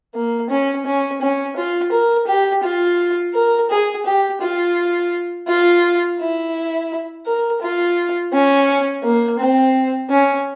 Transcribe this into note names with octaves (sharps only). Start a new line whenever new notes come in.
A#3
C#4
C#4
C#4
F4
A#4
G4
F4
A#4
G#4
G4
F4
F4
E4
A#4
F4
C#4
A#3
C4
C#4